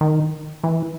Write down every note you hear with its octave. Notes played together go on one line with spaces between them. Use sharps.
D#3
E3